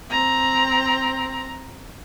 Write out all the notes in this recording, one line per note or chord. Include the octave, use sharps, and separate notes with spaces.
C4 A#5